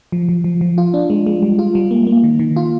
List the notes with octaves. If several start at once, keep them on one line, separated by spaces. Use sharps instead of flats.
F3
F3
F3
F3
F4
D4
G#3
G#3
G3
F4
G3
A#3
A#3
D#3
D#3
F4